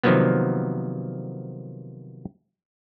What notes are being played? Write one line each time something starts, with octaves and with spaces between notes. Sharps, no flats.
C3 D#3 F3 F#3 A#3 B3